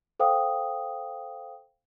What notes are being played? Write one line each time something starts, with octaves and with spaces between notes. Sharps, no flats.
A4 C5 F5 G5 D#6